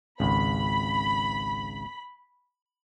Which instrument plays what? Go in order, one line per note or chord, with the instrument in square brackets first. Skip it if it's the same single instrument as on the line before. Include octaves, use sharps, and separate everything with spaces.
[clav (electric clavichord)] G#1 C#2 [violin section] B5